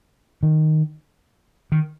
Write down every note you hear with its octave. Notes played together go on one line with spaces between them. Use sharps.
D#3
D#3